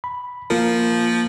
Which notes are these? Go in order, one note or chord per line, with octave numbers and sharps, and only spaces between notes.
B5
F3 A#3 A#4